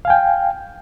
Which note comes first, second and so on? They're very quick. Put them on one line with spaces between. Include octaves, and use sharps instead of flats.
F5 G#5 G5